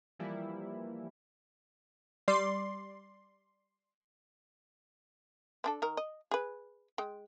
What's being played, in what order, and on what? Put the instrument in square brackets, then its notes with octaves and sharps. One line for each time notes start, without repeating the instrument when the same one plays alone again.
[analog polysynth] E3 F3 G3 A#3 E4
[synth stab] G3 D5 C6
[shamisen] C4 D4 A4
D#3 A#4
D#5
G#4 B4
G#3 G5